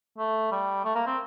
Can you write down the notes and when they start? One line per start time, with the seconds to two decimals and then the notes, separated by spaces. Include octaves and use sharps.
0.18 A3
0.52 G3
0.85 A3
0.95 A#3
1.07 C4